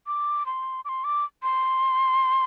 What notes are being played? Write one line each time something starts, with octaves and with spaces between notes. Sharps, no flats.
D6
C6
D6
C6
D6
C6